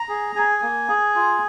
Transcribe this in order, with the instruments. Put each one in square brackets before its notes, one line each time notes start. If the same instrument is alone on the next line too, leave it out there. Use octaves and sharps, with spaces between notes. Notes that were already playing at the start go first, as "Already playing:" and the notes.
Already playing: [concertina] A#5
G#4
G#4 G#5
A#3
G#4
F4